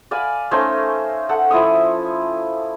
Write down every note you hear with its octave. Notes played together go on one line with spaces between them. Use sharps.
D5 F5 G#5 B5
A3 C#4 D#4 C5
A4 F#5
F3 E4 E5 D#6